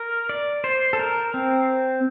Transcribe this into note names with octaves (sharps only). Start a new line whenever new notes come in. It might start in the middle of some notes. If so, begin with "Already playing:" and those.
Already playing: A#4
D5
C5
A4
A#4
C4